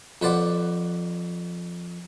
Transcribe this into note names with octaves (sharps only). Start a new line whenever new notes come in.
F2 B4 C5 D5 F#5